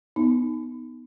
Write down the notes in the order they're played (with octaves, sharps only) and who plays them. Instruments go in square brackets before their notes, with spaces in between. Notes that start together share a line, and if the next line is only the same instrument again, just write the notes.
[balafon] B3 D#4